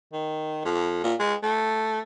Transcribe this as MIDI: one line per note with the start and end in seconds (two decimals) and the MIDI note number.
0.13 0.60 51
0.65 0.99 41
1.04 1.14 46
1.20 1.35 56
1.43 2.00 57